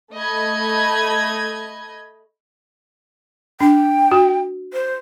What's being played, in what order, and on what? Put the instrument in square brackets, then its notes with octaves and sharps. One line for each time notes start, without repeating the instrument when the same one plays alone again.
[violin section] A3 D#5 B5 G#6
[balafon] D4 [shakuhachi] G5
[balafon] F#4
[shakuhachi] C5